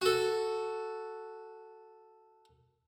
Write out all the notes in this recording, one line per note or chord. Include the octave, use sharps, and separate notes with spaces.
F#4 A4